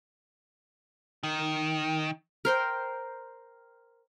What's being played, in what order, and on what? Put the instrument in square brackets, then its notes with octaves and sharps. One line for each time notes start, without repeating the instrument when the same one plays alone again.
[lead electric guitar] D#3
[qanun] A#4 C5 G5